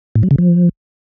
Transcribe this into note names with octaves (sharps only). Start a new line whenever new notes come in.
A2
F#3
C#3
F3